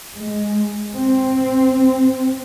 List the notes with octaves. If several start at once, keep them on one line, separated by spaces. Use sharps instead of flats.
G#3
C4